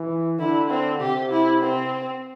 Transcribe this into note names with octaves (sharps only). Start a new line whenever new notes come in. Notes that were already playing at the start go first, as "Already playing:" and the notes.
Already playing: E3
D3 E4
C4
C3 G4
E4
C4